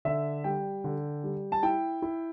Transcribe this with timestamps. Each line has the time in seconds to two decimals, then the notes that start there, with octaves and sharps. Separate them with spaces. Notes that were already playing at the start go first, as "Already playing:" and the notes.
0.05 D3 E5
0.44 G3 G5
0.84 D3
1.24 G3
1.52 A5
1.63 E4 G5
2.02 E4